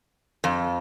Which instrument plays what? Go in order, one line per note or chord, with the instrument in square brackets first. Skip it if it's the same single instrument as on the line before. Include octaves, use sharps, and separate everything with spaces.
[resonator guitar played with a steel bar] F2